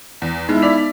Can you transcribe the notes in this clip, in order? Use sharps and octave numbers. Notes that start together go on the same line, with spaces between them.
E2
G#3 B3 D#4 E4 B5
D5 B6 F7